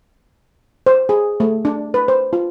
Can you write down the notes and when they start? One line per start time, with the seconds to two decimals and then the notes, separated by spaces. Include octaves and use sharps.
0.86 C5
1.09 G#4
1.40 A3
1.65 D4
1.94 B4
2.08 C5
2.33 F4